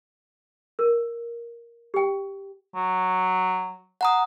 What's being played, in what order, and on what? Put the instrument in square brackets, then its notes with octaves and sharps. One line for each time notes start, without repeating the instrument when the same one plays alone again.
[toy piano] A#4
G4 G5
[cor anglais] F#3
[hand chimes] F#5 A#5 D#6